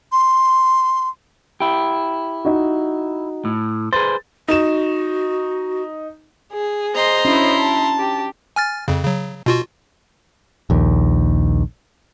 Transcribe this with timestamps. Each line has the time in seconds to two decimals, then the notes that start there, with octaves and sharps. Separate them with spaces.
0.12 C6
1.60 E4 G4
2.45 D#4 F#4
3.45 A2
3.93 G#4 B4 C5 A6
4.48 D#4 F#4 E7
6.52 G#4
6.95 C5 D#5 A#5 C6
7.25 C#4 D4 E4 F#4
7.59 A5
7.99 G4
8.56 G#5 F6 A6
8.88 F2 C#3
9.04 C#3 F#3
9.46 B2 F4 F#4
10.70 A#1 D#2